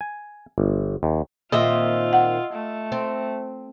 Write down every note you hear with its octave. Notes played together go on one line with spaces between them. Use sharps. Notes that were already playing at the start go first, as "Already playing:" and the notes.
G#5
G1
D#2
A#2 D#3 C4 F4 D#5 E5
F#5
A3
C4